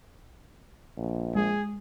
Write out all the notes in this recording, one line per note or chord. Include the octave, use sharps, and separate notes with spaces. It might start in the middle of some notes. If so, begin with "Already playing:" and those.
A#1
G#3 G#4